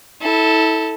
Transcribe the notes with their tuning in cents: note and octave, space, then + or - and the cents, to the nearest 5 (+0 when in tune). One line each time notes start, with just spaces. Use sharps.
E4 -25 A4 +0